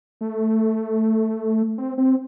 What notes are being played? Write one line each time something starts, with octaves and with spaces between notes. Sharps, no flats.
A3
C4
C4